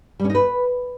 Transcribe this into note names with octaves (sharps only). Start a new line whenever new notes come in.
G3
C#4
D#4
B4